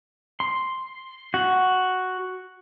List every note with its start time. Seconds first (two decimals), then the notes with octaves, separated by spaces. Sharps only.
0.40 C6
1.34 F#4